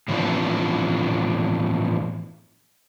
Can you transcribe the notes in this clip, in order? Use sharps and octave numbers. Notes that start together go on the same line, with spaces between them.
A2 E3 F3 B3 C4 D4